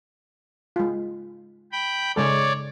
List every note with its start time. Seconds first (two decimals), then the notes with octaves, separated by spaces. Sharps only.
0.76 G#3 F4
1.72 G5 B5
2.16 C#3 G#3 A4 C#5 D5